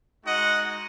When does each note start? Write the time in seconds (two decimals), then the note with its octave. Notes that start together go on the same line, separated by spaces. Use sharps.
0.25 G#3 D#4 F#4 D#5 F#5